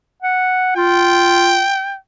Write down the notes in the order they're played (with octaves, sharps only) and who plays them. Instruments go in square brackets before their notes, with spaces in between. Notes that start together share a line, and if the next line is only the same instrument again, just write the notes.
[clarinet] F#5
[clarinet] F4 [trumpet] G5